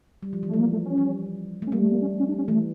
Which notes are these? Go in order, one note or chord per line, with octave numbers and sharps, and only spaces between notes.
G3
F3
E3
F3 A3
A#3
A3
C#4
G3
A3 C#4
G3 A#3
A3
A#3
C#4
C#4
D4
C#4
E3 A3